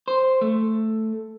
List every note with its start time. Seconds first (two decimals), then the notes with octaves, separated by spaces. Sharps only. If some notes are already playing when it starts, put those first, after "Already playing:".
0.08 C5
0.41 A3